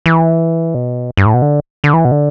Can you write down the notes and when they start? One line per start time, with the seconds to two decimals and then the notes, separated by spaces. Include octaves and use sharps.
0.06 E3
0.75 B2
1.17 G2
1.26 A2
1.34 B2
1.42 D3
1.84 D3
1.93 E3
2.05 B2
2.12 D3